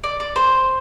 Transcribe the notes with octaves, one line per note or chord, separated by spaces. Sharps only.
D5
D5
C5